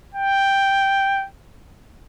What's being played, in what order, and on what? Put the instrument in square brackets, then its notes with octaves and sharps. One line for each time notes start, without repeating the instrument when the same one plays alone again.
[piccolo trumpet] G5